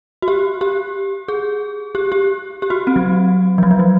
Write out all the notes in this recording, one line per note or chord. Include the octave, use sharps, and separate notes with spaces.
F#4
G4
G4
G#4
G4
G4
G4
F#4
C4
F#3
F3
F#3
F3
F#3